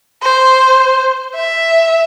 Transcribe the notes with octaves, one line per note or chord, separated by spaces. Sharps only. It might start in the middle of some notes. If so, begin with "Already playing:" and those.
C5
E5